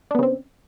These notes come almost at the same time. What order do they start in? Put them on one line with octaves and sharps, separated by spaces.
D4 B3 C#3 C4